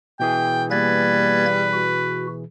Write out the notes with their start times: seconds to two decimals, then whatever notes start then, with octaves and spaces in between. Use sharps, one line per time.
0.20 B2 E3 G#4 G5
0.71 G3 A#3 B4 G#6 A6
1.73 F#4